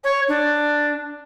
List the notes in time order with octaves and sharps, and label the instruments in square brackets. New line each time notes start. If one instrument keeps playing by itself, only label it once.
[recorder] C#5
D4